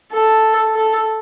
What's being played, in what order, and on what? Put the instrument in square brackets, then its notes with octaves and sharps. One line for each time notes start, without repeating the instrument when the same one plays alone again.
[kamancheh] A4
A4